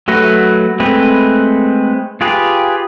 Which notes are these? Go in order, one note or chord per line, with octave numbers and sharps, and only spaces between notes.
F#3 A3 F#4 B4
G#3 A3 C4 B4
F4 G4 G#4 B4